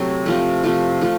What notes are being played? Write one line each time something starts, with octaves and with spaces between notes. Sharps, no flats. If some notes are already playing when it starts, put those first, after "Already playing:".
Already playing: C3 F#3 A3 C4
C3 F3 A3
C3 F3 A3
F3 A3